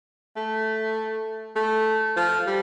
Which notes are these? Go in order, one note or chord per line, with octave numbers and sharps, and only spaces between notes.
A3
A3
F3
G3